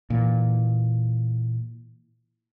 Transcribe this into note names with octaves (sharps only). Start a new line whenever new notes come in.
A#2 E3